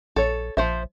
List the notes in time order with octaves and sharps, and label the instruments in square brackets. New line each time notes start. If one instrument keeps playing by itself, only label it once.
[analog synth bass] A#1 [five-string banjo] A4 C#5
[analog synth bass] A#1 [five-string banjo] F3 C5 E5